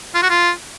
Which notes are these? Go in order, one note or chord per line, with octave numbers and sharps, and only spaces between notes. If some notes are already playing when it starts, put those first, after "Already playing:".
F4
F#4
F4